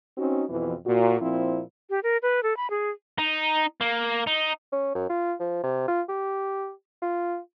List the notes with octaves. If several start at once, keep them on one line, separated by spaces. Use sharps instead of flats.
C4 C#4 D#4 F#4
F2 B2 E3
A#2 F#4
A#2 F3 C4 E4
G4
A#4
B4
A4
B5
G#4
D#4
A#3
D#4
C#4
F#2
F4
F3
C3
F4
G4
F4